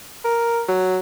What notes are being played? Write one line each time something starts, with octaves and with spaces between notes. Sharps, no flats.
A#4
F#3